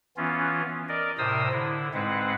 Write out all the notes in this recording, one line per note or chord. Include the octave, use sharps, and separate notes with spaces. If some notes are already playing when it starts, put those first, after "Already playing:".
E3 B3 C#4 F4
A#4 D5 D#5
A2 C3 A#4 C5 D#6 E6
D3 E4
G#2 G#3 C4 B4 F#5